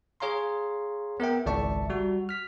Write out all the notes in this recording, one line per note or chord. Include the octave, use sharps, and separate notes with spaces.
G#4 C#5 F5 A#5 C6
B3 A#4 E5 G5
G#1 C#2 D5 E5 A5 C#6
G3 F#4
F6 B6